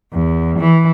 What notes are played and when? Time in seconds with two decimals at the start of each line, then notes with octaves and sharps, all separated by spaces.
0.13 E2
0.60 E3